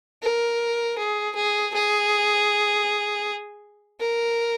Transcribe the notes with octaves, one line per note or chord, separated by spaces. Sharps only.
A#4
G#4
G#4
G#4
A#4